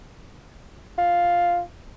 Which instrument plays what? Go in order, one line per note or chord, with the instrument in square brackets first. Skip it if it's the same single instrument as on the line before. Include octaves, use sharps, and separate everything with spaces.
[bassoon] F4